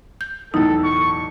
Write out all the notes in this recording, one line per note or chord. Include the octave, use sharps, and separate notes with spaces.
G6
B1 E2 A2 D#4 E4 A4
C#6